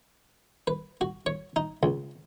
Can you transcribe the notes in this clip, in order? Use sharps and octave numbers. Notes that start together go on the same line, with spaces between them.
B4
F#4
C#5
D#4
C#2